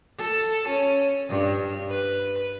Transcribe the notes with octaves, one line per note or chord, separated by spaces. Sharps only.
A4
C#4
G2
B4